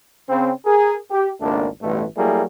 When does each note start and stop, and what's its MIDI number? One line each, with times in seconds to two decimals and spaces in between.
0.29 0.52 49
0.29 0.52 60
0.65 0.95 68
0.65 0.95 70
1.11 1.30 67
1.40 1.67 32
1.40 1.67 37
1.40 1.67 57
1.40 1.67 58
1.40 1.67 62
1.82 2.04 33
1.82 2.04 43
1.82 2.04 47
1.82 2.04 52
1.82 2.04 57
2.17 2.43 54
2.17 2.43 55
2.17 2.43 57
2.17 2.43 58
2.17 2.43 64
2.17 2.43 68